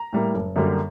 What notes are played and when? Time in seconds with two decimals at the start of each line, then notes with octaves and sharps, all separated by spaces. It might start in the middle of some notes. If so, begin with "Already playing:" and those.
Already playing: A#5
0.13 A2 G3 A#3
0.35 F#1
0.56 F#2 D3 G3 A#3